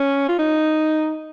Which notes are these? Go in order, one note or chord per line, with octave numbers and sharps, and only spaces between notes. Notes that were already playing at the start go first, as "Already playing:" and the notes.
Already playing: C#4
F4
D#4